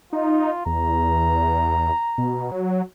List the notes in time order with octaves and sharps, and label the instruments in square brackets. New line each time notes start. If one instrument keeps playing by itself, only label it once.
[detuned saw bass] D#4 [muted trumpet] F4
[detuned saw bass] E2 [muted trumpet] A#5
[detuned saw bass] B2
F#3